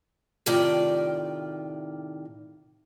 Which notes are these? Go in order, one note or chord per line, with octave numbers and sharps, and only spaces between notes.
A2 C3 D#3 F4 D5 G5